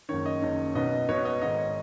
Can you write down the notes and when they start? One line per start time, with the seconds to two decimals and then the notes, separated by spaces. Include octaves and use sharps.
0.09 F#1 F#2 D#3 C#5
0.26 D#5
0.42 F#1 F#2 D#3
0.75 B1 B2 B3 D#4 D#5
1.08 B1 B2 B3 D#4 C#5
1.25 D#5
1.42 G#1 G#2 D#3 D#5
1.58 C#5